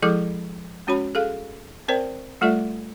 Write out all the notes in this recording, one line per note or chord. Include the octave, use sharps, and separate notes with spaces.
F3 G#3 E4 G#4 A4 D6
G#3 C#4 F#4 C#5 B5
G#4 A4 F5
C4 A#4 C5 D5 G5
G3 A3 F4 A4 D5 E5